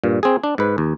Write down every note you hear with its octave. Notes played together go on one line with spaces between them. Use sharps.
G2 A#2
C4 G#4
D4
G#2 B4
D#2